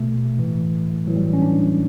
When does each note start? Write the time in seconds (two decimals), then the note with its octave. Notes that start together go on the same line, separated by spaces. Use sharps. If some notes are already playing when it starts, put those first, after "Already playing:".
Already playing: B2 A3
0.38 A2 E3
1.07 A2 E3 F#3
1.16 G3
1.33 C#4
1.42 D4